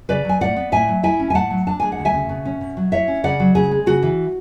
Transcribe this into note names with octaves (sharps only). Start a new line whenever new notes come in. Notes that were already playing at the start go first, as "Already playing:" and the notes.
C#3 B4 D5
F#3 G#5
A2 D5 F#5
B3
A2 E5 G#5
F#3
E4 E5 G#5
C#4
G#5
A2 F#5 A5
F#3
D4 A5
G#3 G#5
F#5
D2
E5 G#5
C#3
B2
C#4
B2
F#3
E4 C#5 E5
C#4
C#3 D5 F#5
F#3
C#3 G#4
G#3
C#3 F#4
E3